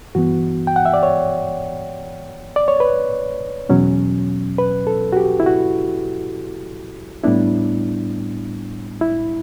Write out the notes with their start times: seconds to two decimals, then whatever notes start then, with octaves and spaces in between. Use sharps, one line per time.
0.15 G2 E3 B3 F#4
0.67 G5
0.76 F#5
0.86 E5
0.94 D5
1.03 C#5
2.56 D5
2.68 C#5
2.80 B4
3.69 E2 B2 F#3 C#4
4.58 B4
4.87 A4
5.13 F#4
5.17 G4
5.40 E4
5.46 F#4
7.23 A2 G3 B3 D4 E4
9.01 E4